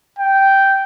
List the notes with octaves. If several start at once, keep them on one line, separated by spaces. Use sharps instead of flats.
G5